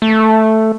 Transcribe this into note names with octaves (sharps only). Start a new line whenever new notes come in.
A3